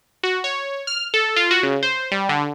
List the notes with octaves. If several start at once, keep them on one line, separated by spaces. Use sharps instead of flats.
F#4
C#5
F6
A4
F4
F#4
C#3
C5
G3
D3